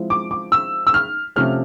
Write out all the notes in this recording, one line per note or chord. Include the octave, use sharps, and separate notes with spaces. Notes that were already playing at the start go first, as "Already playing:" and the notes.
Already playing: F3 G#3 C4 E4
D6
D6
E6
E6
F6
C3 F3 A3 C#4 F6